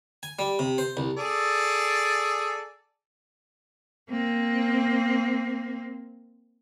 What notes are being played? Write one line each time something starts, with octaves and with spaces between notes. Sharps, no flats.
G#5
G3
C3
C5
C2
G#4 A4 D5
A#3 C4